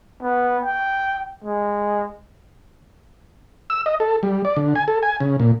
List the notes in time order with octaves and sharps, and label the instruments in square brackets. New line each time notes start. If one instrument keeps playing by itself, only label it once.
[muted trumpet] B3
G5
G#3
[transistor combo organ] E6
D#5
A4
G3
D5
D3
G#5
A4
G#5
C#3
A#2